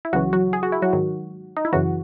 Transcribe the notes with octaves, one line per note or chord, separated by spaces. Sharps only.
E4
C#2 C#3 E3 F#3 F#4
F#3 F#4
G#4
F#4
E4
F#3 F#4
G#2 D#3 F#3
D#4
E4
F#2 C#3 E3 F#3 F#4